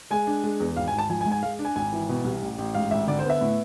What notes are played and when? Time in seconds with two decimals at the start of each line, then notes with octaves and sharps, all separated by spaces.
0.11 G#3 G#5
0.27 D4
0.44 G#3
0.60 E2
0.77 G#1 F5
0.88 G#5
0.93 G#1
0.98 A5
1.09 F3 G#5
1.21 G#5
1.26 G#2
1.32 G#5
1.43 G#3 F5
1.59 D4
1.65 G#5
1.76 G#1 G#5
1.93 E3
2.09 B2
2.25 C2
2.42 A1
2.58 A1
2.75 G#2 F5
2.91 G#1 E5
3.07 D3 D5
3.19 C5
3.24 B3
3.30 E5
3.41 A2